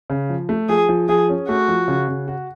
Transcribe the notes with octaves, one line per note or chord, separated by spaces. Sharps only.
C#3
F3
A3
F3 G#4
F3
F3 G#4
C#4
A3 F#4
F3
C#3
C#3
F#4